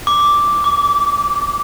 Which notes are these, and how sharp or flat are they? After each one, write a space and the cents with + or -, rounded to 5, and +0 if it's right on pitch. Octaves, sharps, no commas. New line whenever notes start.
D6 -5
D6 -30